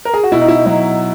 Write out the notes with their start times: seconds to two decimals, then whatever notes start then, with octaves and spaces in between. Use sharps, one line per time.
0.05 A#4
0.14 G#4
0.23 F#4
0.32 B2 E4
0.41 D#4
0.49 E4
0.66 F#3 D#4